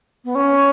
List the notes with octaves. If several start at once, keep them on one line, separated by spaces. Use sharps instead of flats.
B3
C#4